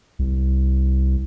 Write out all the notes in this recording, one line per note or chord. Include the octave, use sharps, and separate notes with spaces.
C2